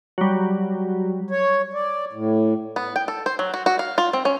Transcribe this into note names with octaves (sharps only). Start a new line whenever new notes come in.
F#3 G3
C#5
D5
A2
B3
G5
A4
C5
F#3
F#4
F#4
F5
F4
C4
C#4